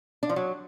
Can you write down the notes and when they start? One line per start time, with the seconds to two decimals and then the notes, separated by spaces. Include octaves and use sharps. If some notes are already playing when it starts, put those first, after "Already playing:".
0.23 D4
0.30 F3
0.36 F#3